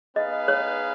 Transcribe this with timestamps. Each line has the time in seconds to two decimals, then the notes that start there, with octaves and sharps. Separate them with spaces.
0.16 B3 D#4 G#4 B4 D#5 F5
0.48 C#5